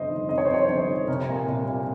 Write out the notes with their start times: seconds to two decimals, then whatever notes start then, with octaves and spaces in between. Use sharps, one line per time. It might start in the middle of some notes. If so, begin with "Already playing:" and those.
Already playing: G1 F2 C3 C5 D#5
0.10 D#3
0.29 C3 D#5
0.38 C#5
0.45 C5
0.49 F2
0.54 C#5
0.68 G1 C#5
0.89 D#3
1.08 C2 A#4
1.29 A#2
1.48 C2
1.68 A#2